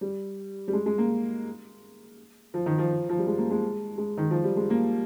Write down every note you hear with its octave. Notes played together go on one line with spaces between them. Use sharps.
G3
G3
G#3
G#3
A#3
F3
D#3
F3
F3
G3
G#3
A#3
G#3
G#3
D#3
F3
G3
G#3
A#3